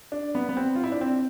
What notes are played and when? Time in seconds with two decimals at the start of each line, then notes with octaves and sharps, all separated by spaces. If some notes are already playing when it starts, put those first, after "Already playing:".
0.12 D4
0.35 B3
0.49 B3
0.57 C4
0.75 F4
0.84 E4
0.92 D4
1.01 C4